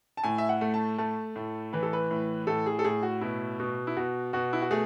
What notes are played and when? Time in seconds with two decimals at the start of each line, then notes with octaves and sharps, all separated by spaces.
0.17 A5
0.24 A2 G#5
0.38 E5
0.49 F#5
0.61 A3
0.74 A5
0.98 A3 A5
1.36 A2
1.73 E3 B4
1.83 A4
1.93 B4
2.11 A2
2.47 A2 A4
2.66 G#4
2.79 A4
2.84 A2 G#4
3.03 F#4
3.21 B2 E4
3.60 B2
3.87 E4
3.97 B2 F#4
4.33 B2 F#4
4.53 E4
4.62 F#4
4.71 A3 G#4